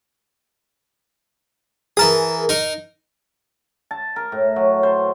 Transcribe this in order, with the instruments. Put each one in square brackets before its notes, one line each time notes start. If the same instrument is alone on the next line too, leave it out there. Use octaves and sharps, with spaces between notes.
[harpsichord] E3 A5 D#6 [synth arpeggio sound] G#4 A#4
[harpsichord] D#4 A#4
[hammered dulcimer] A5
A#4
A2
F#3
C5